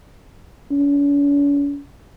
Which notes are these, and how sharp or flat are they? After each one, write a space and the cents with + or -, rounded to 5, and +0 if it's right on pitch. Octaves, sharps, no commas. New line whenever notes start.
C#4 +45